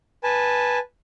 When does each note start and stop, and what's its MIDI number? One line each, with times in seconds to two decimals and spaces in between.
0.23 0.78 71
0.23 0.78 80
0.23 0.78 81